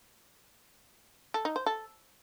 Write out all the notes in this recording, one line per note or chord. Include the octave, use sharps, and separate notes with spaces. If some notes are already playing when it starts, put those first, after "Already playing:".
A4
D#4
C5
A4